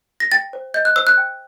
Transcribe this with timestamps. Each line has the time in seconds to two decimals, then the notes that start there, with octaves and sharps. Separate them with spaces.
0.20 A#6
0.32 G5 A6
0.53 C5
0.74 D#5 G6
0.85 F#6
0.96 C5 E6
1.07 F#6
1.17 G5